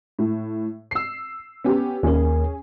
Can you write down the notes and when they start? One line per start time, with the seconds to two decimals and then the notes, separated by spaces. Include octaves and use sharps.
0.19 A2
0.91 E6 C7
1.64 B3 C#4 G4
2.03 D#2 C#4 G#4 A#4